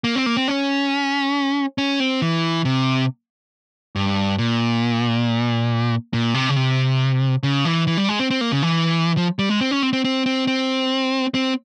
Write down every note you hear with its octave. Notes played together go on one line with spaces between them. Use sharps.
A#3
C4
A#3
C4
C#4
C#4
C4
E3
C3
G2
A#2
A#2
C3
C#3
C3
C#3
E3
E3
G3
G#3
C4
C4
A#3
C#3
E3
F3
G3
G#3
C4
C#4
C4
C4
C4
C4
C4
C4